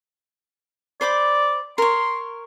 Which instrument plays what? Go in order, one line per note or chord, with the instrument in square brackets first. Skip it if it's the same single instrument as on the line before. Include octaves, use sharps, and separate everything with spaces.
[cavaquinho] C5 B5 D6 [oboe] D5
[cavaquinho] A#4 C#5 [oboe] C6